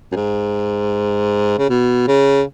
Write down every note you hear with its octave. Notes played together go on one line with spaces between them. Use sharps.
F#2
G#2
C#3
B2
C#3